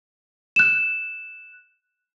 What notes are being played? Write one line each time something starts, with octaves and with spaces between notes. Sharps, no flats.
F#6 E7